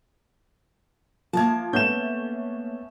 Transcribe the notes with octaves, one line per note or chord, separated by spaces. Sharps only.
F3 A#3 A5 G#6
A3 B3 C#4 G6 E7